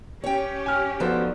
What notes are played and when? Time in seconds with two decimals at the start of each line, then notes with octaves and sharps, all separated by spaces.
0.24 C#4 G4 C#5 G5
0.66 G#5 F6
1.00 F3 B3 D#4 F#4 A4 C5 D5